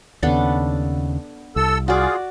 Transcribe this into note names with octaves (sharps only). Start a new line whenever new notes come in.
D#2 C#3 B3 D4 A4
C2 A4 E6
F4 F#4 G#4 D5